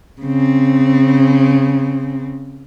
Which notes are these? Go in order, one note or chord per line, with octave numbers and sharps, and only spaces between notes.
C#3 C4